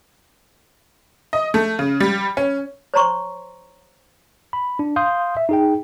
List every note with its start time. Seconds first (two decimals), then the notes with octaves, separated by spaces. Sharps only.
1.33 D#5
1.54 A3
1.79 C#3
2.00 G3
2.37 C#4
2.94 C5 C#5 A#5 C6 C#6
4.53 B5
4.79 D4
4.96 F5 C6 D#6 G6
5.37 E5
5.49 D#4 G#4 G5